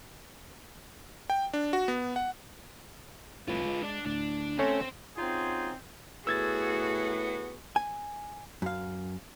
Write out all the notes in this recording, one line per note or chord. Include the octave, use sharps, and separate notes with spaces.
G5
D4
F#4
B3
F#5
F1 C2 A2 F4 B4
G#3
D4
D2 A2 D4
A3 C4 C#4 C#5
C4 C#4 D#4 F4 F#4 G#4
A2 B3 F#4 G#4 E6 G#6 A6
G#5
F#2 F5